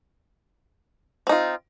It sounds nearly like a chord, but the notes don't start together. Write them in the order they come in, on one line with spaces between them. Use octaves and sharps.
C4 D#4 F4